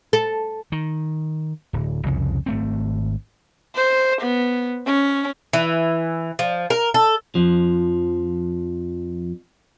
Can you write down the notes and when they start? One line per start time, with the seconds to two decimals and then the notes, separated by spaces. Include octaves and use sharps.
0.13 A4
0.72 D#3
1.73 D1
2.06 C2 F2 C#3
2.46 G#1 A3 C4
3.76 C5
4.22 B3
4.87 C#4
5.53 E3
6.39 F3
6.70 A#4
6.94 A4
7.35 F2 F3